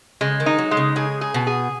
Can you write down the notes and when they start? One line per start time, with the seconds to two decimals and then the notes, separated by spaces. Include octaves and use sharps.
0.21 C#3 G#3
0.40 D#3
0.46 D#4
0.58 F#3
0.71 G#3
0.77 C#3
0.96 C#3 G#4
1.21 G#4
1.34 B2
1.47 G#4